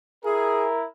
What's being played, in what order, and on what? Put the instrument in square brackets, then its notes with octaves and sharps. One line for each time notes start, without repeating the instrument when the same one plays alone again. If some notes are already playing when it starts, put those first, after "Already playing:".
[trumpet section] E4 A#4 [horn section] G#4